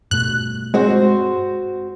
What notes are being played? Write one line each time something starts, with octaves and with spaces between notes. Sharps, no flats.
G2 B2 A3 F#6
G#3 C4 F#4 C5